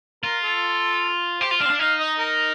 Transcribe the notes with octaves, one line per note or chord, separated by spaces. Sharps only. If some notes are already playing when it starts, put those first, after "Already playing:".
F4 A#4
A4
G4 C5
F4
D4 F5
C4
D4
D#4 F5
D#5
A#4